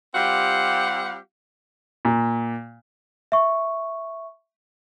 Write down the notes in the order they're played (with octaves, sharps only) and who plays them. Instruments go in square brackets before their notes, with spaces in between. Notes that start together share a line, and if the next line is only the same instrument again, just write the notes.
[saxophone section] G3 C4 F4 G4 F5 F#5
[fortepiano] A#2
[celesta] E5 C#6